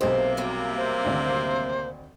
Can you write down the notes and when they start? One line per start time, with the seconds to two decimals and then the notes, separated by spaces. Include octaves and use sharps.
0.01 B1 C3 A#3 G4 C5 D#5
0.37 E2 F#3 G3
0.77 C5
1.05 G#1 D2 C4